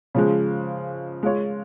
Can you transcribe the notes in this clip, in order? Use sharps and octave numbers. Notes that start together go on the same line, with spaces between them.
C#3 F3 G#3
G#3 F4 C#5